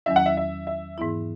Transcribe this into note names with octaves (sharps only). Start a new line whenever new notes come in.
E2 D#3 F#3 C#4 E4 E5
F#5
E5
E5
E5
G#2 E3 B3 E4